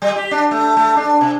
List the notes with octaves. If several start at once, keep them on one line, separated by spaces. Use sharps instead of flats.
G3
G4
D4
A3
A3
D4
C3